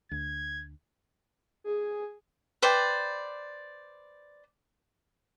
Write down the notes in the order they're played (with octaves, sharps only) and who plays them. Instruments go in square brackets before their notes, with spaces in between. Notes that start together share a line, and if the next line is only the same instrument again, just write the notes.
[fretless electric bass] D2 [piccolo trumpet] G#6
[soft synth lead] G#4
[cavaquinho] B4 C5 D5 G5